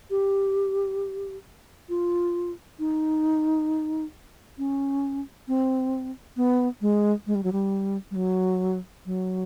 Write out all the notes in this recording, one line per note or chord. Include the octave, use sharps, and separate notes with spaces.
G4
F4
D#4
C#4
C4
B3
G#3
G#3
G3
F#3
G3
G3
F#3
F#3